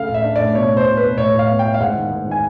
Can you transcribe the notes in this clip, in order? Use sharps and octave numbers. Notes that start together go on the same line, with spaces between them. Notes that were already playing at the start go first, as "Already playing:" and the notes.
Already playing: C#3 A3 F5
A2
E5
D4
A2 D5
B2 C#5
B2
C5
B2
B2 B4
A2 C#5
A2
F5
B3
G5
E4
F5
G#2 F#5
D#3
G#2
D#3
G#5